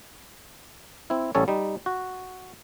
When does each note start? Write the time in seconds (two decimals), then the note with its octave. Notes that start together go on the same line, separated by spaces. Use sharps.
1.10 C4 E4
1.35 A1 G3 C#4 A4 C#5
1.48 G3 D#4
1.86 F#4